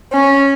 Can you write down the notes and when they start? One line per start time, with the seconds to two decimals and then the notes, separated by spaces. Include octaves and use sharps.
0.12 C#4